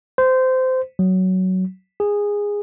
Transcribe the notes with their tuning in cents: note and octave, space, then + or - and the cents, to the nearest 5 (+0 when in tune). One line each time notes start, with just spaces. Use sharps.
C5 -20
F#3 +10
G#4 -15